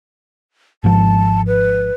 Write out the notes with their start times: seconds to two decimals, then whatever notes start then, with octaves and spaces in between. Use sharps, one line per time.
0.84 G#1 G#2 F3 A5
1.47 B4